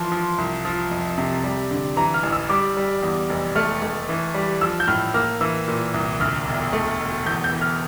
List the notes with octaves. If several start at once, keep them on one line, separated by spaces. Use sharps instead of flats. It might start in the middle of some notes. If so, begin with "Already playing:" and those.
Already playing: E3 F3 C6
F3
C2
F3
F2
C3
G3
D3
E3 A#5
F6
A1
E6
G3 D6
G3
E2
F1
A3 F6
A3
E3
G3
F3 E6
G6
A2 F6
A#3 F6
E3 E6
A#2
C2
D2 F6
E1
A3
E1
E2 G6
G6
E3
F6